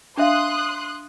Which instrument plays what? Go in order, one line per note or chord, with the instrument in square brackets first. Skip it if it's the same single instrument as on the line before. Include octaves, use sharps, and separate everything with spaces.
[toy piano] D4 E5 F5 [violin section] C6 D#6 F#6